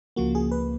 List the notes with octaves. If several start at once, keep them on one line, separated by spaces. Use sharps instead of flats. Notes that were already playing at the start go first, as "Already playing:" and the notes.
C#2 C#3 F3 A#3 F#4
G#4
B4